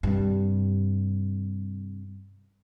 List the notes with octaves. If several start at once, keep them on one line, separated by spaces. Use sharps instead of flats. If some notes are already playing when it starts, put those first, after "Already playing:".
G2 C3